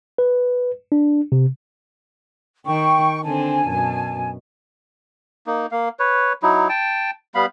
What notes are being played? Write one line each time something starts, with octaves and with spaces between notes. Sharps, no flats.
B4
D4
C3
D#3 G5 C#6
D3 C4 G#5 A5
F#2 B2
A#3 D#4
A#3 F5
B4 C#5
F#3 D#4 E4
G5 A5
G3 B3 F5 B5